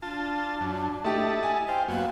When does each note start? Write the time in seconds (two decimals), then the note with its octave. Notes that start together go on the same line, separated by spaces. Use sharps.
0.02 D4 F4 A5
0.61 F#2
1.04 A3 E4 G4 D#5 A5
1.43 G#5
1.68 C5 F5 G5
1.88 F#2 A#3 B3 F#4